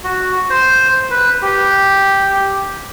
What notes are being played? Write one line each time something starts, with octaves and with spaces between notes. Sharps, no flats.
F#4
C5
B4
G4